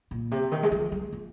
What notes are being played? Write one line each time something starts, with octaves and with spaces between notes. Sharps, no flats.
A#2
C3
D#3
G#3
F3
G#3
F3